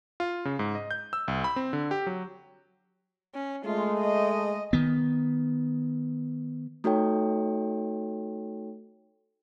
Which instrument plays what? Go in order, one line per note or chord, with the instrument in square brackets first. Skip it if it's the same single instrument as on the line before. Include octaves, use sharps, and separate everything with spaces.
[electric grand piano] F4
C#3
G#2
D#5
G6
E6
C2
B5
C4
D3
G4
F#3
[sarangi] C#4
[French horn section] G#3 A3 [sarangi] F4
[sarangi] D#5
[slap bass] D#3 B3
[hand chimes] A3 D#4 F#4 A4 C#5 G5